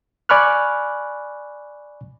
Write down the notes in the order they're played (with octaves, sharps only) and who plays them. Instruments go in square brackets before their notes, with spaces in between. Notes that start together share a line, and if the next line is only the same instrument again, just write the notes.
[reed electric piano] D5 G#5 B5 C#6 F6 F#6